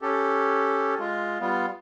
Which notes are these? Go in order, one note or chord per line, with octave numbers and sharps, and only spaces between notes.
C#4 G4 A4
G#3 F4
G3 B3 F4